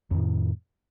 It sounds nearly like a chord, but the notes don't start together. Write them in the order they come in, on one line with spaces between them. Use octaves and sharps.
F2 D#3 A2